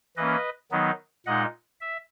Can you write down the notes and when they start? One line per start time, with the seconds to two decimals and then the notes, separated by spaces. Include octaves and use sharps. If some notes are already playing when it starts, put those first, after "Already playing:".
0.17 E3 A#3 C#4 B4 D#5
0.71 D#3 F#3 B3 D#4
1.26 A#2 G#3 D#4 D#5 F#5
1.81 E5